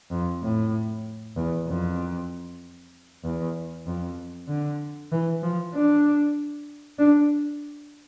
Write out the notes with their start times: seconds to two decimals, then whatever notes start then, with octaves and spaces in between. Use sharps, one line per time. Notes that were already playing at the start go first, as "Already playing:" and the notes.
0.11 F2
0.43 A2
1.36 E2
1.68 F2
3.24 E2
3.86 F2
4.48 D3
5.12 E3
5.43 F3
5.74 D4
6.99 D4